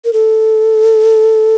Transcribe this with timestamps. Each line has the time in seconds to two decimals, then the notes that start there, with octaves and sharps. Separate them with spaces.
0.05 A#4
0.13 A4